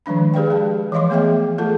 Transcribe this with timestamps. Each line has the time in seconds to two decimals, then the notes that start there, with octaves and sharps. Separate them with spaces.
0.06 D#3 F3 G#3 D4 B5
0.34 G4 G#4 B4 D5 F5 G5
0.50 G#3 A5
0.92 E3 F3 D#5 F5 C6 D6
1.10 A3 B3 G#4 E5 G5
1.58 A3 F4 G#4 A4 A5